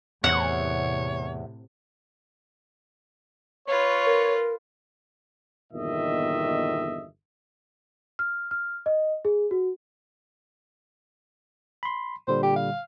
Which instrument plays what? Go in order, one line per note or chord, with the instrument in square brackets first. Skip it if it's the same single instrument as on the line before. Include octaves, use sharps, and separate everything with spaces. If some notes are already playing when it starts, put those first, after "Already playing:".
[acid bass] E2 [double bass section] A2 C3 [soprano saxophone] C#5 [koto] F#5
[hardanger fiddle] F4 B4 [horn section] C#5
[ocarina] A#4
[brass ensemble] G1 E2 A#2 D#3 D#5 E5
[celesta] F6
F6
D#5
G#4
F#4
[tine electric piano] B5 C6
[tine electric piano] A#2 D3 G3 [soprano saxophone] C5
[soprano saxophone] G4
F5